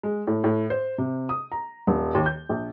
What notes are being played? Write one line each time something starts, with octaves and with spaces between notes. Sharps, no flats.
G#3
A2
A2
C5
C3
D#6
A#5
D#1
D#2
G6
A#1